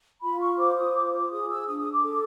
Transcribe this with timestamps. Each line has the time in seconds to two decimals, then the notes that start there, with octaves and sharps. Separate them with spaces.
0.22 F4 B5
0.40 C#6
0.58 C5 D6
0.77 D#6
0.95 F4 D6
1.13 D6
1.31 G#4 D#6
1.49 E6
1.67 D4 D#6
1.80 D#6
1.92 D6
2.03 A4